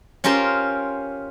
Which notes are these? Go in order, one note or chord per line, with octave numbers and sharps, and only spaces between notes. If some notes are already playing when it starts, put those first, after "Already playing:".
C#4 F4 G4 A#4 C5